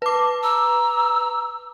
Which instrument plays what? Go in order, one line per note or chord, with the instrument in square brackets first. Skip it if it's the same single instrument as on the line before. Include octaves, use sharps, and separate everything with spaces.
[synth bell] B4 D6 [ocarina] A5
[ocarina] A#5 [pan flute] E6